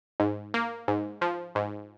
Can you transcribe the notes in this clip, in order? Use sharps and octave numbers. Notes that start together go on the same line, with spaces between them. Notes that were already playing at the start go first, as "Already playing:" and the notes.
G#2
A#3
G#2
F3
G#2